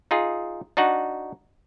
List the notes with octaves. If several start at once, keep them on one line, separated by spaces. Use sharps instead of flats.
D#4 F4 G#4
D4 D#4 F#4 F#5